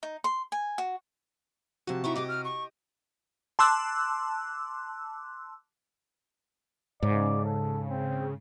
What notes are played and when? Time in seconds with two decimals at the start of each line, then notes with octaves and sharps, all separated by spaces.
0.03 D#4
0.24 C6
0.52 G#5
0.78 F#4
1.87 C3 F3 F#4 A5
2.04 D#4 E4 G4 C#6
2.16 G4 D#5 D6
2.29 F6
2.44 C#6
3.59 A5 C6 D6 E6 F#6
7.02 G#2 C#3 D5
7.45 A4
7.88 C4